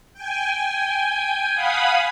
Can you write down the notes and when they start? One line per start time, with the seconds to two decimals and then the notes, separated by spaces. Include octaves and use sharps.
0.13 G5 G#5
1.55 F5 F#5 G#5 B5 D#6